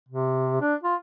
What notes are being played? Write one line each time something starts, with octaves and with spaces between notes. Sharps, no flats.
C3
D4
F4